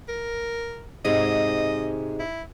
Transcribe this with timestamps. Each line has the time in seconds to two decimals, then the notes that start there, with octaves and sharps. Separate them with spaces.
0.08 A#4
1.05 G#2 C3 G#3 D#5
2.19 E4